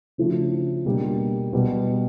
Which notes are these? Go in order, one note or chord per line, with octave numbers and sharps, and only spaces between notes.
C#3 F3 A3 D4 F#4
B2 G3 A#3 D4 G4
B2 G3 B3